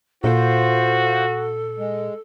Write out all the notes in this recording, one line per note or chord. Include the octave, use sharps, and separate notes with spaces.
A#2 F4 F#4 A4 C5
G#3